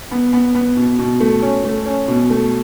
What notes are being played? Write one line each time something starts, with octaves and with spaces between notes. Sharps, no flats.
B3
B3
B3
B2
B2
A3
C#4
A3
C#4
B2
A3